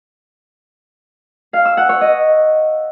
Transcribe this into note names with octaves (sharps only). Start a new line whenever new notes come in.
F5
E6
F#5
C#5
D#5